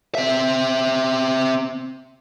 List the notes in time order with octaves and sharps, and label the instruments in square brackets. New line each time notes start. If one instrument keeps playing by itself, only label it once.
[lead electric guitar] C4 E5